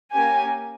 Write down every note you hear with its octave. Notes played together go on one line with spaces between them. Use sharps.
A#3 C#4 G4 G#5